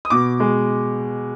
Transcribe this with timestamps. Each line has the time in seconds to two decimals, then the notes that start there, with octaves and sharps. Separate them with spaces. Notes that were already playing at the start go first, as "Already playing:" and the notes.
0.05 D#6
0.10 B2 D6
0.40 G#3